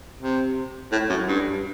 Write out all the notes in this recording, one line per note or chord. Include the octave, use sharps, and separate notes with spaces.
C3
A2
F#2
G2